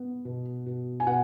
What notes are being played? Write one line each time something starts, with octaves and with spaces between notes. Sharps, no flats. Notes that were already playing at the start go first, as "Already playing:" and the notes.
Already playing: B3
B2
B2
G#5
B2 F#5